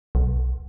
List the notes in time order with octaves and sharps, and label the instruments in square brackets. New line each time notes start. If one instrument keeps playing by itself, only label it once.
[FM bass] B1